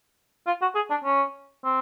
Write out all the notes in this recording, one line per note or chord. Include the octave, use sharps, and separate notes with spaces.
F4
F#4
G#4
D4
C#4
C4